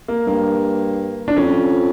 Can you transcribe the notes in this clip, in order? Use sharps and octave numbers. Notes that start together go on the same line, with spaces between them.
A#3
G2 A#3
D4
F2 C#4